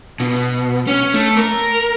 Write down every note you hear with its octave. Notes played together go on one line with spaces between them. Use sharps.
B2
C#4
A3
A#4